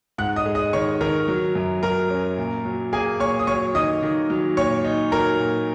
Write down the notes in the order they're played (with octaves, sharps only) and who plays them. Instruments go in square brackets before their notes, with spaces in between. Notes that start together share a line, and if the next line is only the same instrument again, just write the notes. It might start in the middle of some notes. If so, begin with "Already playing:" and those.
[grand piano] G#2 F#5 F#6
D#5 D#6
G#3
D#5 D#6
D#3 C#5 C#6
D#3 A#4 A#5
F#3
F#2
F#3 A#4 A#5
C#4
A#2
F#3
A#3 G#4 G#5
A#2 C#5 C#6
D#6
F#3 C#5 C#6
D#3 D#5 D#6
D#3
F#3
A#2 C#5 C#6
D#4
F#3 A#4 A#5
A#2